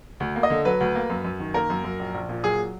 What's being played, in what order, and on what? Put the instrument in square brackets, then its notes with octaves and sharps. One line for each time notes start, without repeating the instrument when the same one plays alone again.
[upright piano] D2
A#3
D#5
D3
F#3 B4
D2
A#3
F#2
F#2
D#3
A#3 A#4
F#2
F#2
A#1
A#1
A#2
F#3 G#4